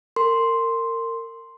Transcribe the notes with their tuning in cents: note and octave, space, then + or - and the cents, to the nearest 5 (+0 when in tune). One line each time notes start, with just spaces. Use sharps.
A#4 -30 C6 +0